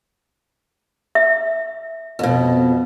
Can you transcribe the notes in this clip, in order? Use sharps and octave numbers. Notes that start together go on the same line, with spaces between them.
E5
F2 B2